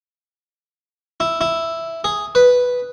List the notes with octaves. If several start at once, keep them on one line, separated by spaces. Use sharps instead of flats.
E4
E4
G#4
B4